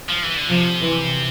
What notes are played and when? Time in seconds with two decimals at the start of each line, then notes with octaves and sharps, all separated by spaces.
0.09 F3
0.23 E3
0.37 D3
0.50 C3 F3
0.82 E3